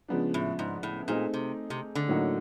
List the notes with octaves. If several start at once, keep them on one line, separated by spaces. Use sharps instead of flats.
C#3 F3 G#3 B3 D4
A2
G#2
A2
A#2 A3 C4 D#4 G#4
C3
C3
D3
A2 F#3 A#3 D#4 F#4